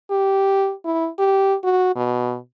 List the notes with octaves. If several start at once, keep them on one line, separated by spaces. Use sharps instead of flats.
G4
E4
G4
F#4
B2